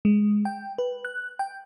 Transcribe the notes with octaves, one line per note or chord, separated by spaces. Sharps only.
G#3
G5
B4
F#6
G5